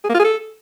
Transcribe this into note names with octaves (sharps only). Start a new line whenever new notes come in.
G#4
A#3
F4
G#4
A4